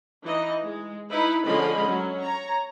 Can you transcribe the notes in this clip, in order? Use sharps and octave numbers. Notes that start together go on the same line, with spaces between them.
E3 D#4 E4 D#5
G#3
D#4 E4 B4 B5
D3 F3 G#3 C#4 D#5 B5
F#3 C#4
C#5 A#5